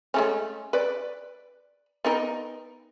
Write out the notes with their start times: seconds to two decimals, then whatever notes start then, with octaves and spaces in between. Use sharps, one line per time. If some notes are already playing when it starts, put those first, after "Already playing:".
0.14 G#3 A3 C#4
0.73 B4 D5
2.05 B3 D#4 A#4